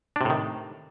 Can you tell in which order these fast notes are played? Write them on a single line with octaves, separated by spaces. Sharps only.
D4 C3 A2 D#3